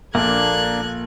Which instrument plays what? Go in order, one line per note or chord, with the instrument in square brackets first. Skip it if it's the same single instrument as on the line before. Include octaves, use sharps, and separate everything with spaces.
[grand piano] A#1 [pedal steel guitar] A#3 D4 [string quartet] A4 F#6 G#6